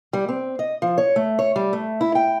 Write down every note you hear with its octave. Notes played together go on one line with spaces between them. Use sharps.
G3
C4
D#5
F3
C#5
A3
C#5
G3
A3
E4
G5